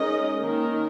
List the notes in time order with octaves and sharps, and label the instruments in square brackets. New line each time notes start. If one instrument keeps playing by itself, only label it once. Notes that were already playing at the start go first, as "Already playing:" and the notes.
Already playing: [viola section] G#3 D#4 A#4 D#5 [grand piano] C#4
[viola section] D#3 A#3 D#4 A#4